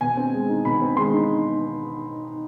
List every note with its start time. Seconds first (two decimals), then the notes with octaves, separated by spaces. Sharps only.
0.01 B2 G#5
0.17 C4
0.33 G#3
0.50 D#4
0.65 B2 B5
0.82 C4
0.97 G#3 C6
1.14 D#4